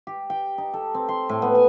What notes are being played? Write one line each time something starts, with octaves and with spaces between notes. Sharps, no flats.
G4
G5
D#4
A4
C4
C6
A2
B3
G#5